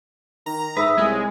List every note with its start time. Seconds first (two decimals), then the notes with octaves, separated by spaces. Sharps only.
0.46 D#3 A#5
0.77 G#2 B4 E5 D#6 E6
0.97 C2 G#3 G#5
1.10 C#5